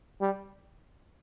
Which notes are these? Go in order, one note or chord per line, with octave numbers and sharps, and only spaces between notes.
G3